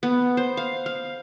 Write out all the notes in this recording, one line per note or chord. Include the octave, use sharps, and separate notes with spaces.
B3
C5
F5
F5